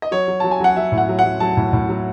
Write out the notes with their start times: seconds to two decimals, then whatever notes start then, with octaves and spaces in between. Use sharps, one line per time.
0.02 D#5
0.11 F#3 C#5
0.28 F#3
0.40 F#3 A5
0.51 G#5
0.60 F#3 F#5
0.76 F#3 E5
0.92 A2
0.98 F#5
1.09 F#3
1.19 F#5
1.24 F#3
1.40 F#3 A5
1.57 A2
1.73 A2
1.89 F#3